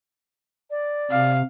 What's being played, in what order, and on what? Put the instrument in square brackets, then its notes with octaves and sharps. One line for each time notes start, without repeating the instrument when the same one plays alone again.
[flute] D5
[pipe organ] C3 [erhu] F5